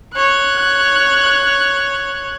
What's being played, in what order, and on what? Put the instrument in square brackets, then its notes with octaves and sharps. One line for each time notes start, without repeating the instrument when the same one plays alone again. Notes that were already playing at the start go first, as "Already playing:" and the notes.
[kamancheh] C#5 F#6